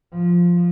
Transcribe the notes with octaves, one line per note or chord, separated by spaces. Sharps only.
F3